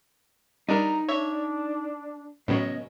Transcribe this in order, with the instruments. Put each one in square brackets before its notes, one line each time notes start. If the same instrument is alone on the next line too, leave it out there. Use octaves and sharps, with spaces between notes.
[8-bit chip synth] G3 D4 A#4 [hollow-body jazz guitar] D#4 [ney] A#5
[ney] D4 [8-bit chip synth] C#5 E5
[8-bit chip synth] A2 F#3 [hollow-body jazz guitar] C#3 B3 C#4 [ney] D#5